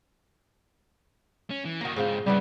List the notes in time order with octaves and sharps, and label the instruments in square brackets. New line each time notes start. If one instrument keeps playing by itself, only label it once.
[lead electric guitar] C#4
E3
[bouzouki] D#3 A#5 [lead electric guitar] A#3 F#4
[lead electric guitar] G#2 [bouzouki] C#3 C4 F4
[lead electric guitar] G#2 C#3 [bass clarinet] G3 [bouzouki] B3 E4 G4